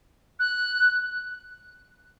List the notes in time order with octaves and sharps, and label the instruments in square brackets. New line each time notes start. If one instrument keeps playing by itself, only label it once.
[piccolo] F#6